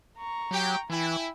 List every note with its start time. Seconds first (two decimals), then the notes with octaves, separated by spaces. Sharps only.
0.17 A#5 C#6
0.51 F#3 G4 G5
0.90 E3 E4 G5 G#5